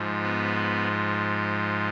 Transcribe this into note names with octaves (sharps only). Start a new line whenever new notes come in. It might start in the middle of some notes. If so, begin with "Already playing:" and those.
Already playing: G#2 F3
B3